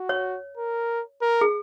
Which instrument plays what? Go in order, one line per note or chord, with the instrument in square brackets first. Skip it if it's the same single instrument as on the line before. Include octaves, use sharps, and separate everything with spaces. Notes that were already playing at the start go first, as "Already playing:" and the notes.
Already playing: [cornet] F#4
[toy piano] C#5
[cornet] A#4
A#4
[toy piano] G#4